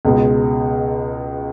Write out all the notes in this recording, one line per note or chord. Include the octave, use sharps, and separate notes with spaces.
C#2 B2 G#3